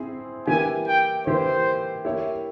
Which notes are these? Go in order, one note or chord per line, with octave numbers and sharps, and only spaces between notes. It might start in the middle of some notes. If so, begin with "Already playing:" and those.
Already playing: C4 E4 G#4 C5
E3 A#3 E4 G4 G#5
G5
E3 A#3 E4 G4 C5
A#3 E4 G4 C#5 E5